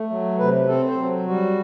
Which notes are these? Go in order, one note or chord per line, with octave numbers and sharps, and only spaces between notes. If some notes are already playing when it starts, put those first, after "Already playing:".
Already playing: A3
F#3
C3 B4
C4 A4
C5
F#3
G3 F#4